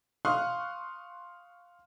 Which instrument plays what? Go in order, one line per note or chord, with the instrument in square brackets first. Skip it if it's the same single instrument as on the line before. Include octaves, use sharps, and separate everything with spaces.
[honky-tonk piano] F5 C6 C#6 D#6 F6 F#6